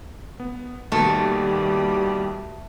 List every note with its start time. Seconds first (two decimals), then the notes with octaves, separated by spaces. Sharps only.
0.40 B3
0.92 D#2 B2 G3 A3